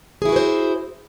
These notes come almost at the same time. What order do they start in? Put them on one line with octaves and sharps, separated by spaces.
G#4 E4 F#4 B4 C5